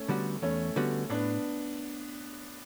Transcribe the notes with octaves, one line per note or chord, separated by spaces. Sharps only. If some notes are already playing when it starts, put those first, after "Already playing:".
Already playing: A3 C#4
D3 G3 B3 F#4
E2 A3 C#4
D3 G3 B3 F#4
A2 B3 D4